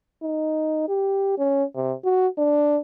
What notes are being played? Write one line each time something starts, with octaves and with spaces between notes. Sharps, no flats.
D#4
G4
C#4
C3
F#4
D4